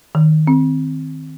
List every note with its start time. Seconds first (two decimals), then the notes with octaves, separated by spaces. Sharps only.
0.15 D#3
0.47 C4